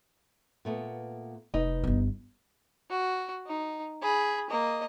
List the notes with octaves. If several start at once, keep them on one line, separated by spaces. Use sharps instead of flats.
A#2 A3 B3
F1 D#4 B4 D#5
G1 B3
F#4
D#4
G#4 B5
A#3 D#5